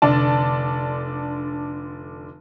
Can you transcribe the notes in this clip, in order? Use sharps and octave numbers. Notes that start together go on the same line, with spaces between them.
F1 D3 D5 A5